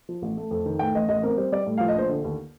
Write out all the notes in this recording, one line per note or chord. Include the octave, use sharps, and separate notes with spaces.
F3
A1
A3
F2
D#3
A2 G5
A1 D#5
A1 D#5
C4 A#4
G3 C5
G3 D5
A2
F5
F3
D#5
A#1 C5
D3
D#2